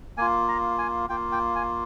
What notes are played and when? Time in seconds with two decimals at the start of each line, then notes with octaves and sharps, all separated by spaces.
0.17 A#3 F4 G#5
0.48 A#5
0.78 G#5
1.09 A#3 F4 G5
1.32 G5
1.56 G#5